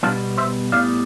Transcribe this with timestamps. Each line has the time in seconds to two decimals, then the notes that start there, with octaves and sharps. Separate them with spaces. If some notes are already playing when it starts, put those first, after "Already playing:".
0.03 B2 G3 B3 D4 F4
0.38 C5 E5
0.72 A2 G3 B3 D5 F5